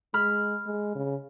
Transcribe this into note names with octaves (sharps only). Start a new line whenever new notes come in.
G#3 B5 F6
G#3
C#3